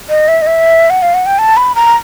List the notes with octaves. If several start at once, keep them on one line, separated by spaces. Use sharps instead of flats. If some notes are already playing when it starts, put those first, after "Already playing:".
D#5
E5
D#5
E5
F#5
F5
F#5
G5
A5
B5
A#5